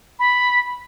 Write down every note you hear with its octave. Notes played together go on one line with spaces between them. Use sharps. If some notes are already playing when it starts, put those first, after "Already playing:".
B5